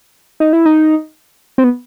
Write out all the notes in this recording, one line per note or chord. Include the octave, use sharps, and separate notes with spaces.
D#4
E4
D#4
C4
B3